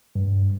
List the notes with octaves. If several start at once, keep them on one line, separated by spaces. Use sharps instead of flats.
G2